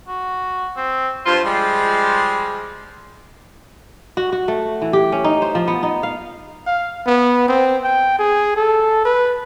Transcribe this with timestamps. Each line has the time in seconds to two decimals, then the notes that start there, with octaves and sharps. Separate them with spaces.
0.08 F#4
0.77 C4
1.26 G2 F4 C5
1.44 F3 G3 G#3
4.17 F#4
4.32 F#4
4.48 A3
4.82 E3
4.93 G4
5.12 C#4
5.24 D#4
5.42 C5
5.55 F3
5.68 B3
5.83 D#4
6.03 F5
6.67 F5
7.07 B3
7.48 C4
7.83 G5
8.19 G#4
8.56 A4
9.05 B4